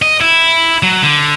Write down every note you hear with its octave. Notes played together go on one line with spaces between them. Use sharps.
D#5
E4
F#3
D3